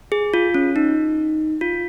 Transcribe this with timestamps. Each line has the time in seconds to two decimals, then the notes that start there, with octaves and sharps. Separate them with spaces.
0.12 G#4
0.34 F4
0.54 C#4
0.76 D#4
1.61 F4